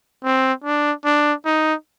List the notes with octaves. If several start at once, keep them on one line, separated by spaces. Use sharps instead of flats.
C4
D4
D4
D#4